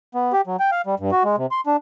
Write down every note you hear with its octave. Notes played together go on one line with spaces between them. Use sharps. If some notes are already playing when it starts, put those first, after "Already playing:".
B3
G4
F#3
G5
F5
G3
G2
F#4
G#3
C3
C6
D4